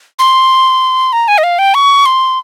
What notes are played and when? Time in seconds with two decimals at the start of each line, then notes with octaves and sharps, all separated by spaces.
0.19 C6
1.13 A#5
1.28 G#5
1.38 D#5
1.43 F5
1.59 G5
1.74 C#6
2.06 C6